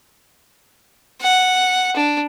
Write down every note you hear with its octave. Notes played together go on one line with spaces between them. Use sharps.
F#5
D4